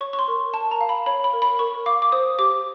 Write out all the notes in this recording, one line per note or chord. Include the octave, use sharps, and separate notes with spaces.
C#5 C#6
C#6
C6
A#4
A#4 A5
A#5
F5
B5
C#5 B5
B5
A#4
B5
A#4 C#6
F5 D6
D6
C5 D#6
G4 D6